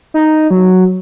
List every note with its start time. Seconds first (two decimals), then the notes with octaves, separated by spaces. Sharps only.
0.14 D#4
0.51 F#3